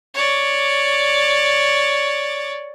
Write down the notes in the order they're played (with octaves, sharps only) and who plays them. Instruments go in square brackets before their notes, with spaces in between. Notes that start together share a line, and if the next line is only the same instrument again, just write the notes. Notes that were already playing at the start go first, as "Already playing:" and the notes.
[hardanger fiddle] C#5 D5